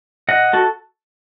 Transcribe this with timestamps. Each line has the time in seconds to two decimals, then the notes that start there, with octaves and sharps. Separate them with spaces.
0.29 D#5 F#5
0.53 F#4 A4